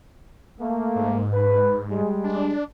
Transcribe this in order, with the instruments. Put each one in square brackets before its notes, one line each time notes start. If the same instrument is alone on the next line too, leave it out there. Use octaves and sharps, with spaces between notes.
[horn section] A3 A#3
[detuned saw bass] G#2
[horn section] B4
G3 G#3
[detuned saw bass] D4